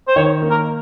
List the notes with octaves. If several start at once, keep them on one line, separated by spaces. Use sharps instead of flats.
C5
D#3 C#5
A#3
A#4